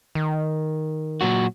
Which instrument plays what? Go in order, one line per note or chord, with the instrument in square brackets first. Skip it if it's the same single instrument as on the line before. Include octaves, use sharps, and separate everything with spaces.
[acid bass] D#3
[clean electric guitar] A#2 F#3 F#4